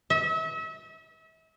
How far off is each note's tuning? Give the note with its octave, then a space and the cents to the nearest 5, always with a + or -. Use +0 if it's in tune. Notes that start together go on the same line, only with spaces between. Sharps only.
E5 -35